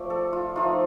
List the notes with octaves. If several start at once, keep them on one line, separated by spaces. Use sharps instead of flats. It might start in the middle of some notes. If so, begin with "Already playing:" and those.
Already playing: F3 A3 D5
A4
F4
F3 A3 D#4 F4